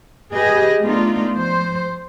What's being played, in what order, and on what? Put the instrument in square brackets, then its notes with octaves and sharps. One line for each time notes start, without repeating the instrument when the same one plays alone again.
[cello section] G4 G#4 B4 D#5
A3 B3 D4 D#4 F4
F3 C5